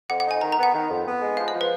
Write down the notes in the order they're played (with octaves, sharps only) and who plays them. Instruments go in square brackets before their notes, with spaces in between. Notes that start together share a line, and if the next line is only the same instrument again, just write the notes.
[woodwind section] F2 [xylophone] F#5
[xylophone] F#5
[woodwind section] D#4
[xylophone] G#5
[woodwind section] D#3 [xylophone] A#5
[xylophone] A#5
[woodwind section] B3
[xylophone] F#5
[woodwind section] D#3
F2
B3
G#3
[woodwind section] F3 [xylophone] F5
[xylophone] D#5
[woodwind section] F3
[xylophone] B4